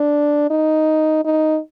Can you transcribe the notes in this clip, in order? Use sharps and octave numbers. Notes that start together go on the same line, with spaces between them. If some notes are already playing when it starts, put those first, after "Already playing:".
Already playing: D4
D#4
D#4